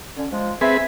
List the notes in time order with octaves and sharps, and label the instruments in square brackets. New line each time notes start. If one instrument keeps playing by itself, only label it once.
[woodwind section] D3 C#4
F3 G#3
[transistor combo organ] C4 G#4 B4 [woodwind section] E5